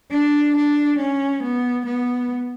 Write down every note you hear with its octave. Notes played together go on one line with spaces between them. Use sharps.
D4
D4
C#4
B3
B3